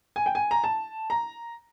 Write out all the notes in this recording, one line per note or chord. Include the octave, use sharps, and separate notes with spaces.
G#5
G5
G#5
A#5
A5
A#5